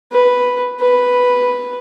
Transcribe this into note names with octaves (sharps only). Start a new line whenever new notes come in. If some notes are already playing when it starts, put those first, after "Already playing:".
B4
B4